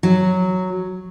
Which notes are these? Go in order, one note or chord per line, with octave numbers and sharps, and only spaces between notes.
F#3